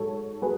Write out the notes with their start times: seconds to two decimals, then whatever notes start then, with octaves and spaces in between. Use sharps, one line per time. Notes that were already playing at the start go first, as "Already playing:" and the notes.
Already playing: G#2 F#3 A4 C#5
0.41 F#3 G#4 B4